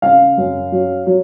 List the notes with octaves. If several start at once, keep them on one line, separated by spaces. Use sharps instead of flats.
C#3 F5
F#2
F#3
F#3